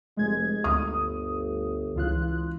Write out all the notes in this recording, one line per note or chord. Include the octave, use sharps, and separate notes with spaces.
F1 G#3 G#6
G1 D2 D#6
C#2 E3 F4 F#6